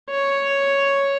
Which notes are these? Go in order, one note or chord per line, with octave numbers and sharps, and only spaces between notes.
C#5